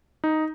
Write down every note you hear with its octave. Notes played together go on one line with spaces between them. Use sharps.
D#4